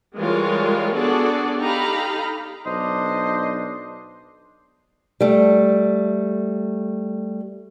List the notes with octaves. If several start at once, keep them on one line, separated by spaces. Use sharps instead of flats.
E3 G3 G#3 F4 A#4 C#5
B3 D4 F#4 G#4 A4 D5
D#4 G4 A4 F5 A#5 B5
B1 D4 C5 D#5
G3 A3